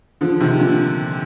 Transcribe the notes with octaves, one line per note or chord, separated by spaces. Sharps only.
D3 F3
C3 D#3
A#2 D3